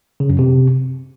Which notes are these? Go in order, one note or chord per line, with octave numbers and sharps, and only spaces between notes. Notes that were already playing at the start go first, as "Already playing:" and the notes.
C#3
F#2
C3